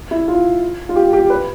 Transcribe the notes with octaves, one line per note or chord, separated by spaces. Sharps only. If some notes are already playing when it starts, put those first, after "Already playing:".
E4
F4
F4
G4
G4
B4